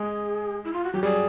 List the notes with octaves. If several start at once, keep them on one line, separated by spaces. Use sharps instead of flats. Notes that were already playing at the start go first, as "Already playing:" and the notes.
Already playing: G#3 G#4
E4
F4
F#4
F#3 G4
G3 G#4